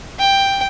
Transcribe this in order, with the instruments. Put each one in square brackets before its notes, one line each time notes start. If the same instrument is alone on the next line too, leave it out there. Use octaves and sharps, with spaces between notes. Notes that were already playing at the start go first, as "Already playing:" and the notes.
[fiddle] G5